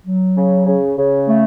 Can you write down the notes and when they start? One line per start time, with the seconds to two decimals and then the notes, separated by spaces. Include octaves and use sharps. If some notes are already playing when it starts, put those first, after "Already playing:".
0.06 F#3
0.36 C#3
0.66 C#3
0.97 C#3
1.27 A3